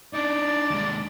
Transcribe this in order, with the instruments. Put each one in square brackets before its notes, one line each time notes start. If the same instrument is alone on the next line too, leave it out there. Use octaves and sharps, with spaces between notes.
[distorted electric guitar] D4 D#4 [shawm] D5
[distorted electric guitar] D#2 G#3